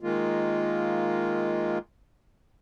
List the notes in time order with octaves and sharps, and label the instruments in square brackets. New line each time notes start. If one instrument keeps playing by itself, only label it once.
[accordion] D#3 G#3 A#3 F4